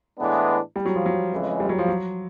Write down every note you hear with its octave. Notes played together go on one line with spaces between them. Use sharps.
A2 E3 G#3 B3 D4
G3
F#3
F3
F#3
F2 C#3 E3 G#3
G3
F#3
F3
F#3